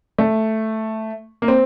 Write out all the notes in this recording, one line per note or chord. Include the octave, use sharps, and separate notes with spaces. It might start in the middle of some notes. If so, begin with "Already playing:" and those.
A3
A#3
C4